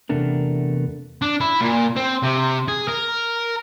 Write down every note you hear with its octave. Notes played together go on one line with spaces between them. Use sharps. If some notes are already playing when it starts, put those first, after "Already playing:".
E2 C3 A3 B3 D4 A#4
D4
E4
A#2
C4
C3
G#4
A#4